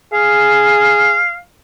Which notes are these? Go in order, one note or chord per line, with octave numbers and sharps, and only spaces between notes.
G#4 F5